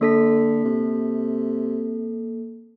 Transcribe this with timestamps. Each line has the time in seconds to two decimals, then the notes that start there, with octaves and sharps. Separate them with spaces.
0.01 D3 A#3 A4 B6
0.65 C3